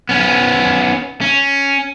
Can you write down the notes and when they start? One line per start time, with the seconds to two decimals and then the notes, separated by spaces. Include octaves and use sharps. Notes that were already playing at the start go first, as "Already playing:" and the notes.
0.09 B3 C#4
1.21 C#4